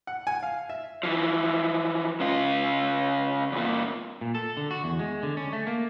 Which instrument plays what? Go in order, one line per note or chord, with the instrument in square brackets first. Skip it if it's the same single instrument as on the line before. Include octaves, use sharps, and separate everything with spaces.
[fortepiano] F#5
G#5
F5
E5
[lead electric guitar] E3 F3
C#3 F4
E2 A#2
[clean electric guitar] A#2
A4
D3
F#4
E2
G#3
D3
C#4
A3
A#3